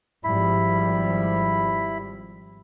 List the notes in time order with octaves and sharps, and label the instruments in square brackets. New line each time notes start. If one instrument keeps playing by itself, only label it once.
[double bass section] G#1 F3 G3 [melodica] E4 B5